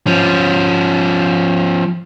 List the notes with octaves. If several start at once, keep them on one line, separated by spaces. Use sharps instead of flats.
F3 C#4